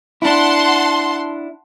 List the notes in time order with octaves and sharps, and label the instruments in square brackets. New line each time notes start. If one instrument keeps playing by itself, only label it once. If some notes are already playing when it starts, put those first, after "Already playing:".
[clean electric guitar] D4 E4 [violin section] F#5 A5 C6